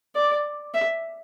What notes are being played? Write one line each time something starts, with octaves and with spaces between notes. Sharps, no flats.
D5
E5